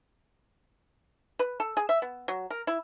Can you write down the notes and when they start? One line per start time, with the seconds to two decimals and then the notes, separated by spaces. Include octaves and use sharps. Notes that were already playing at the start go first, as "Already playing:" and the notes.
1.39 B4
1.60 A4
1.77 G#4
1.89 E5
2.02 B3
2.28 F#3
2.50 A#4
2.67 E4